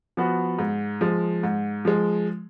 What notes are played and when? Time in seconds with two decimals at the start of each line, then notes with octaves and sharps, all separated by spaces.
0.17 F3 B3 F#4
0.59 G#2
1.01 F3 G#3
1.43 G#2
1.85 F3 G#3